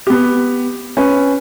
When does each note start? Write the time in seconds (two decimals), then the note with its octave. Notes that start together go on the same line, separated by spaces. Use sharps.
0.07 B3 G4
0.97 C#4 B4